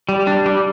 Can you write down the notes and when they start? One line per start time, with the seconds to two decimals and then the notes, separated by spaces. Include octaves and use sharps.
0.09 G3
0.27 D4
0.46 G3